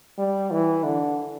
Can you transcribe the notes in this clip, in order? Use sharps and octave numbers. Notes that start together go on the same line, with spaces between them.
G3
E3
D3